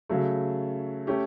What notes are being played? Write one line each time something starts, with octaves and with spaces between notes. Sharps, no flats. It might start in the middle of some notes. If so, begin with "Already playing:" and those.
C#3 F#3 A3
A3 C#4 G4